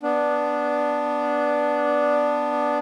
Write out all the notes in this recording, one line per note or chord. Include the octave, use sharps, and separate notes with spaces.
B3 D4